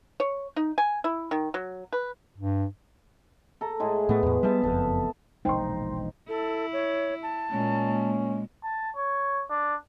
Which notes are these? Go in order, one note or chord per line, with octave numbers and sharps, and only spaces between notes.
C#5
D#4
G#5
E4
D#3
F#3
B4
G2
A4 A#5
A2 G#3 G#4
A2 A3 B3
E2 A2
G3 G#3 B3 E5 A5
F#1 F2 A4
E1 A#1 G#3 D#4 C5 G5 C6
E4 A4
C#5
A5
A#2 G#3 A#3 C#4
A5
C#5
D4